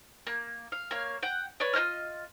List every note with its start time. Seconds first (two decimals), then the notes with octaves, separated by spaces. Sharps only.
0.27 A#3
0.72 F5
0.91 A#3 C#5 F5
1.23 F#5 G5
1.60 B4 C#5 D5
1.73 F4 C5 D#5 F6